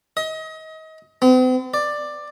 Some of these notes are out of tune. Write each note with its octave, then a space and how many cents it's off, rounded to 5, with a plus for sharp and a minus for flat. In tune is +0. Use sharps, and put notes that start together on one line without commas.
D#5 +30
C4 -45
D5 +10